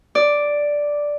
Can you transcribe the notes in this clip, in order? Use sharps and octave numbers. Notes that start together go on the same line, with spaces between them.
D5